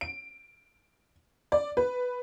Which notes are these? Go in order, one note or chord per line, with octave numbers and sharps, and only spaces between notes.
D7
D5
B4